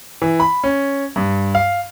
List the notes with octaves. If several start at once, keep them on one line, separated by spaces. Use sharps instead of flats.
E3
B5
C#4
G2
F5